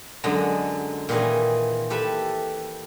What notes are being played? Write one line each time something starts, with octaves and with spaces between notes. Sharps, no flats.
F#2 D3 F#3 G#3 D#5
A#2 D#3 E3 G#4 D#5
G4 A4 B4 E5